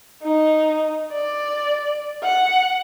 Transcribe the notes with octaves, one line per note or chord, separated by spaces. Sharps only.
D#4
D5
F#5